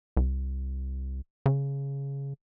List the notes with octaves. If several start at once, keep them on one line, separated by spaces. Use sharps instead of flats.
C2
C#3